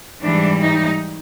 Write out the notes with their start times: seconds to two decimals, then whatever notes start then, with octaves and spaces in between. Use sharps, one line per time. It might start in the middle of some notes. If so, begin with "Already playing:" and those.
0.21 G#2 E3 G3 D4
0.60 D#4